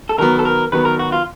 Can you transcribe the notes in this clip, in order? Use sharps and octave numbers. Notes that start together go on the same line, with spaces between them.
A4
D#3 F#3 B3 A#4
A4
A#4
D#3 F#3 B3 B4
A#4
F#4
F4